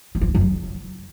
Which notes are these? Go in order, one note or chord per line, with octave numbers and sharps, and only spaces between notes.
F#3
F3
D#3
F#2
C#3